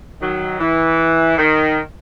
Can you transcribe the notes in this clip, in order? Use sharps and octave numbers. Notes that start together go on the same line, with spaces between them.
D#3 F#3
E3
D#3